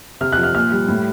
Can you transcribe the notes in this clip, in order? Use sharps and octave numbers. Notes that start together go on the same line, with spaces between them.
C3 F6
F#6
F3
F6
A#2 F6
G3
A2